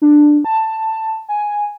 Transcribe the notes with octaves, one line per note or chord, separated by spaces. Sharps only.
D4
A5
G#5